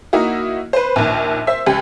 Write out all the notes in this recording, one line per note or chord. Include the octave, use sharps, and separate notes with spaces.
A#3 D#4 E4 F#4
B4 C5
A#1 D#2
C5 E5
C#2 G4